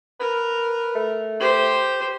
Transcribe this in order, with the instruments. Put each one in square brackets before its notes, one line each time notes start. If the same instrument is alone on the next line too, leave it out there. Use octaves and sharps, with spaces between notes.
[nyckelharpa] A#4 [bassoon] B4
[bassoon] A3
[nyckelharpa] G4 C5